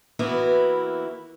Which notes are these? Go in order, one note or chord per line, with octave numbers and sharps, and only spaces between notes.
E3 A#3 B3 E4 F#4